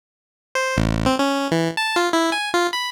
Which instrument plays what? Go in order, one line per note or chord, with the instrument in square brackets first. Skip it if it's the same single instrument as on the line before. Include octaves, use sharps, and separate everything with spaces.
[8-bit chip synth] C5
A1
C4
C#4
E3
A5
F4
E4
G#5
F4
B5